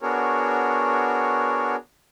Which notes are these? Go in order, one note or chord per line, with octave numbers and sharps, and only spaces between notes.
B3 D4 F#4 G#4 A#4 C#5